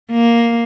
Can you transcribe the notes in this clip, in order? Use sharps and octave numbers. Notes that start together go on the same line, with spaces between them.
A#3